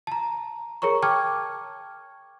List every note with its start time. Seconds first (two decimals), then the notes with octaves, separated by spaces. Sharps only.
0.07 A5 A#5
0.82 G#4 A#4 C#5 A#5 C#6
1.02 G5 A5 C#6 D6 F6 G#6